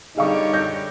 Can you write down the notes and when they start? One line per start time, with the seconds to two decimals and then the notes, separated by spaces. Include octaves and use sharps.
0.17 D3 G3 D#4 G#4 C#5 F5 C#6
0.53 G6 A#6